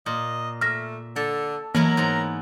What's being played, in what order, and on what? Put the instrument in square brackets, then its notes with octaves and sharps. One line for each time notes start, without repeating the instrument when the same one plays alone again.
[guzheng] A#2 [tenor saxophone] D#5
[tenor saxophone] A3 [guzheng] E5 [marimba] F6 A#6
[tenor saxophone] D3 [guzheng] A4
[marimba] E3 A#3 [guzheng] F#3 B3 E4 [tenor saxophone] A#4
[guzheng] G#2 B3 A#5